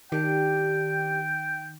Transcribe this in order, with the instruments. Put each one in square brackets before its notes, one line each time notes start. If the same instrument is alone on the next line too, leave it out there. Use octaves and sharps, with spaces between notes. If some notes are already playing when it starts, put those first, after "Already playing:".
[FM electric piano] D#3 [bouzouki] D4 G4 [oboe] G5